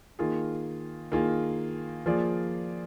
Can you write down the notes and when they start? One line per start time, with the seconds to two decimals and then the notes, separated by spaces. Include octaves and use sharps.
0.19 D#3 A#3 F4 G#4
1.12 D#3 A#3 F4 G#4
2.06 F3 A#3 F4 G#4 D5